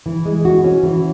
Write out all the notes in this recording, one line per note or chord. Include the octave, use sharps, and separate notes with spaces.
E3
G#3
F#4
C#4
E3